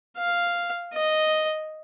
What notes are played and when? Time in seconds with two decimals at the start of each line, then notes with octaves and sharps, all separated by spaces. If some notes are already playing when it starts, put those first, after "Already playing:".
0.18 F5
0.94 D#5